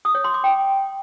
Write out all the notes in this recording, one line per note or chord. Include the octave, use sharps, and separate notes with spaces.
D#6
C#5
C6
D6
G5